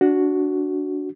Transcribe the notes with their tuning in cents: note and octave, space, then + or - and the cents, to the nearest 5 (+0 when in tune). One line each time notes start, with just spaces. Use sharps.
D4 -15 F#4 +0